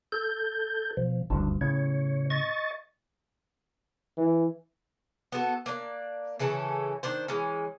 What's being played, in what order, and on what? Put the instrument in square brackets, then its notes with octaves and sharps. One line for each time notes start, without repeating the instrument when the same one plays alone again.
[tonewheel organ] A4 G6
B2 F3
[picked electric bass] F#1 D2 G2 [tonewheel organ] D4
[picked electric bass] A2 C#3 [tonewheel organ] C#5
[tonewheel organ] D#5 C#6 A6
[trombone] E3
[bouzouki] B3 F#4 A4
A#3 D4 D5
C#3 E3 C#4 A4
D#3 D4 C5
E3 G#3 C#4